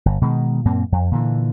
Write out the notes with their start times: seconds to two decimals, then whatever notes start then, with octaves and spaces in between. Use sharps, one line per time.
0.06 G1
0.21 B2 D#3 G#3
0.65 F#2 A#2 A#3 C4
0.92 F2
1.11 A#2 D3 E3